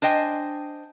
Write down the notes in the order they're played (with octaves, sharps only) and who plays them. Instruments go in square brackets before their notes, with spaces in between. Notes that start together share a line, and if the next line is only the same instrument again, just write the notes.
[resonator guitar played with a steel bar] D4 C5 D#5 G5 G#5